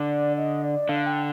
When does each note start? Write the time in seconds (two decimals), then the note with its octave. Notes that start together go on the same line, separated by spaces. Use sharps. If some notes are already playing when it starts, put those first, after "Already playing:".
Already playing: D3 D5
0.38 D#5
0.64 D5
0.89 D3 F5
1.06 G5